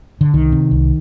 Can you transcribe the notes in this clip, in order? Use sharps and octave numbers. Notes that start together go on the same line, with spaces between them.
D3
C2 D#3
C3
C2